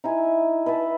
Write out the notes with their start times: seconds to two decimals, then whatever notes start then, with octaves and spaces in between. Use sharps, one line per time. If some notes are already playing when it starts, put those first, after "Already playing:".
0.04 D#4 E4 G#5
0.66 B4 D#5 E5 A5